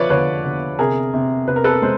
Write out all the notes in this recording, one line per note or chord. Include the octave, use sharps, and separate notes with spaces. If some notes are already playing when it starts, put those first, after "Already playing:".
Already playing: D3 F3 B4 C#5 D5 E5 F5
D3 B4 C#5
D3
C3 G#4 A#4
C3
C3 B4
A#4
A4 B4
G#3 C5